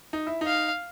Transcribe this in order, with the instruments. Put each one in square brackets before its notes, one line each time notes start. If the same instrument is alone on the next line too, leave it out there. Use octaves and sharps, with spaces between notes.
[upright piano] D#4
E4
D#4
[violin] F5